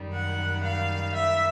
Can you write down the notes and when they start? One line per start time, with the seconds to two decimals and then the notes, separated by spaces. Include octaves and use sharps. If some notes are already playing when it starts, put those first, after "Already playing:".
Already playing: F#2 D#3 G3
0.13 F#5
0.64 F5
1.14 E5